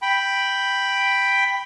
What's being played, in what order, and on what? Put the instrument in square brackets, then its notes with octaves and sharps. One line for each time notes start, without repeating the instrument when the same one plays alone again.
[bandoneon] G5 B5